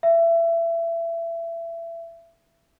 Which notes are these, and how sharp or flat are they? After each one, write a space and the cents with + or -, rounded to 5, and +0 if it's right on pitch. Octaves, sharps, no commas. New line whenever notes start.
E5 +25